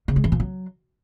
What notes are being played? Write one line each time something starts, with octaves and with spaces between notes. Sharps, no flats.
C#3
G#3
E3
A#2
F#3